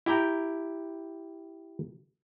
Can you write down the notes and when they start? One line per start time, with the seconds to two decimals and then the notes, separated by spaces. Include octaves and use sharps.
0.06 E4 G4 G5 A#5